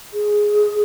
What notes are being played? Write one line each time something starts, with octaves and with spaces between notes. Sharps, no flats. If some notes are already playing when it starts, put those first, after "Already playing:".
G#4